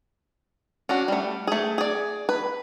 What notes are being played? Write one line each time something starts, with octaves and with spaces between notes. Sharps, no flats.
C#4 D4 F#4
G3 A3
A3 G#4
G#4 D5
B4